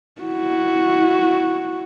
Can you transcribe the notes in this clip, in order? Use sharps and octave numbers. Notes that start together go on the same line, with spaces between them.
E4 F#4